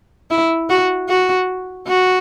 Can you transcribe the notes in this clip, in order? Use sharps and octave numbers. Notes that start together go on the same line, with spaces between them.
E4
F#4
F#4
F#4